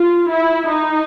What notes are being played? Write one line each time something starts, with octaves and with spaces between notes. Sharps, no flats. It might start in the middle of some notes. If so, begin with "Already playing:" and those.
Already playing: F4
E4
D#4